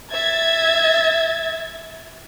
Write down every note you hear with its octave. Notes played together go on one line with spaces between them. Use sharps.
E5 G#6 A6